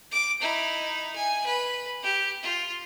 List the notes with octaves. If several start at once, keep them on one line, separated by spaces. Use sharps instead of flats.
D6
D#4 E4
G#5
B4
G4
F4